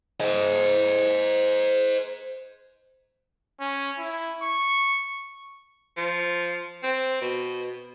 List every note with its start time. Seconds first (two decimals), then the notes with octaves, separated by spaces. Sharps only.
0.20 C5 D#5
3.60 C#4
3.99 E4
4.43 C#6
5.97 F3
6.83 C4
7.22 B2